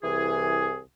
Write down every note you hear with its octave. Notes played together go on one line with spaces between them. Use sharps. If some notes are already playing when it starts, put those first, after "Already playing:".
C2 E3 G#4